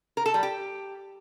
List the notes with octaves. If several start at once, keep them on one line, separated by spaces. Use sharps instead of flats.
A#4
A4
G3
G4